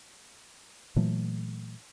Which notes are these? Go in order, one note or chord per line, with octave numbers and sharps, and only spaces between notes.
A#2 E3 F#3 A3